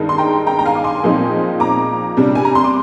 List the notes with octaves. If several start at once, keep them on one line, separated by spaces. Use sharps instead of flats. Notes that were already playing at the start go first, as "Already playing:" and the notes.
Already playing: G2 D#3 G#3 D#4
C6
G5 A#5
G5 A#5
A#5
F5 G#5
D6
G#5 C6
A#2 F3 G#3 C4 D#4
A#5 D6
C3 G3 D4
G#5
A#5
C6
D6